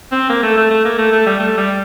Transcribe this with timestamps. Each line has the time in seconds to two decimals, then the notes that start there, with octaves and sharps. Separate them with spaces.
0.12 C4
0.29 A#3
0.43 A3
0.57 A3
0.71 A3
0.85 A#3
0.98 A3
1.12 A3
1.26 G3
1.40 A3
1.57 G3